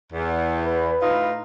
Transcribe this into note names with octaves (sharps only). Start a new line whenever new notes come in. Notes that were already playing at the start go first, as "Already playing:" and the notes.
E2
B4
A2 D#4 F4